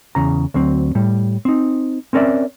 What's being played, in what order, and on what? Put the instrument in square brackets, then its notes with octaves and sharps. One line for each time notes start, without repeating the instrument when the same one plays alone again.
[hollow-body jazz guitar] E2 C#3 A#5
D2 F#3 C4
A2 G3
C4 D#4
C4 C#4 A#4 D5 E5